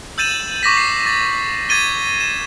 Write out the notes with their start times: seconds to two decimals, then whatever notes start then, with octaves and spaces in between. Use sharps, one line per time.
0.18 E6 G6 A6 D#7 E7 F#7
0.63 C#6 D6 A#6 B6
0.77 C7
1.05 D6 A6
1.69 D6 G#6 A6 D#7 G7
2.20 E7